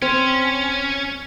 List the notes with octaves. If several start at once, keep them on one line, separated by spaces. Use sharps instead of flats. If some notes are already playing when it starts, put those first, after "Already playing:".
C4 C#4